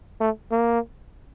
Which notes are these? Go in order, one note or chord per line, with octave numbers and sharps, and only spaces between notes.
A3
A#3